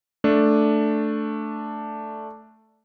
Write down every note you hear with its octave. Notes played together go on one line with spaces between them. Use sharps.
A3 D4